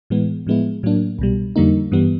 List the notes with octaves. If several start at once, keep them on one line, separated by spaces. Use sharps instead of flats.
A2 E3 G#3 B3
A2 F3 G#3 B3 E4
A2 F#3 A#3 D4
C2 B2 G3
F2 D3 G3 A#3 D#4
G2 E3 G3 B3